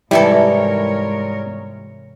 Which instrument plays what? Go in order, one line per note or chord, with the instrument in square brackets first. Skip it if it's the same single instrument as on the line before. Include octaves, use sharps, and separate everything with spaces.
[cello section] G#2 A#4 C#5 [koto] C3 E3 A4 [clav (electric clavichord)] G3 [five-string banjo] E4